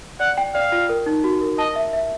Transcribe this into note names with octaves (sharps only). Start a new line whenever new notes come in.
D5 F#5
G5
D5 F5
F4
A#4
D#4
F#4
A#4
D#5 A5
E5
E5